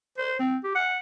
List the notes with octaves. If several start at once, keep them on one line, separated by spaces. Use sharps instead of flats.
C5
C4
G4
F#5